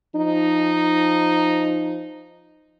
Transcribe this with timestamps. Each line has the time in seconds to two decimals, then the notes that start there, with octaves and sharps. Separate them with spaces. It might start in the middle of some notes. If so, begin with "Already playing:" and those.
0.15 F3 D#4